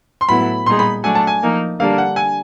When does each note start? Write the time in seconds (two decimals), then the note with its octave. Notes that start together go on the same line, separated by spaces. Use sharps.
0.21 C6
0.29 A2 F#3 B3 E4 B5
0.66 A#2 G3 B3 D#4 G#4 C6
0.79 B5
1.04 F#3 A3 D4 F#4 G#5
1.15 A5
1.27 G#5
1.42 F3 A#3 D#4
1.80 D3 G3 A#3 D4 F5
1.98 F#5
2.16 G#5